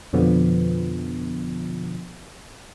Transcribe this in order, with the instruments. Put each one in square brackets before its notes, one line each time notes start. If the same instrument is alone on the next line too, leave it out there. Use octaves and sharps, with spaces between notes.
[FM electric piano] F2 B2 D3 F3 B3